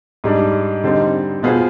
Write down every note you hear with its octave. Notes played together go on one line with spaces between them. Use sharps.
G#2 G3 D4
D3 G3 C4 D#4
B2 B3 F4 G#4 C5